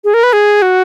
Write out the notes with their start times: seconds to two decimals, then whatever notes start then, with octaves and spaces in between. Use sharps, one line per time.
0.04 G#4
0.14 A#4
0.23 B4
0.33 G#4
0.62 F#4